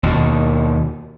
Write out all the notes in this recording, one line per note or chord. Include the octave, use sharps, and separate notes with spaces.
D#2 B2 D#3